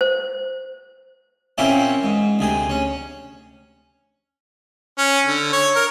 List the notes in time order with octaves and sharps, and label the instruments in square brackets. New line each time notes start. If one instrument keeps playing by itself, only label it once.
[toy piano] C5
[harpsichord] A#2 A#3 C4 C#4 E4 G4
G#2
D2 C3 G#4
C#4
[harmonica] C#4
D3
C#5
A#4